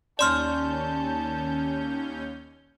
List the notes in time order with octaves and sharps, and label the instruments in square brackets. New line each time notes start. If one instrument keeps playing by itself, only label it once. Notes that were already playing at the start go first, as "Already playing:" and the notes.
[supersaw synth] D#2 C#4 G6 [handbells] D5 C6 F6 [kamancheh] A5